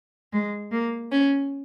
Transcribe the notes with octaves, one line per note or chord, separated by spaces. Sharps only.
G#3
A#3
C#4